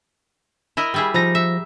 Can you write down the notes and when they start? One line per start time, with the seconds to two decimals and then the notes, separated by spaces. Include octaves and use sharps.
0.77 E4 A#4 D#5
0.94 G3 E4 G#4
1.14 F3 D#4 A#5 A#6
1.35 E5